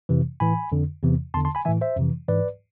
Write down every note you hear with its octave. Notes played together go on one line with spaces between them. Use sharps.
F2 C3 E3
A2 E3 G#5 B5
F2 D3
E2 C3 E3
E2 D3 A5 C6
A5 C6
G#5 B5
A2 E3 E5 G#5
C5 E5
F2 C3 E3
G#2 E3 B4 D5